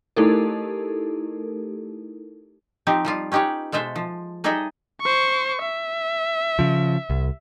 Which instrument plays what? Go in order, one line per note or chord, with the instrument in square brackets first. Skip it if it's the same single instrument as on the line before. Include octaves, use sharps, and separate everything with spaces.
[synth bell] A3 D#4 E4 G4 A4 A#4
[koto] F3 C4 D#4 G4
F3 G3 F4
C#4 D#4 G4 B4 C#5
B2 G#3 A4 C5 E5
F3
G3 D#4 G#4 A4 D#5 E5
[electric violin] C5 C#6
E5
[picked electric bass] C#3 F3
C2